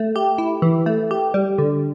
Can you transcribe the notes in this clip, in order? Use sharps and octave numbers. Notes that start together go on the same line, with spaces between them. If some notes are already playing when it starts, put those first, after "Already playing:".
Already playing: A3
G4
E4
E3
A3
G4
G3
D3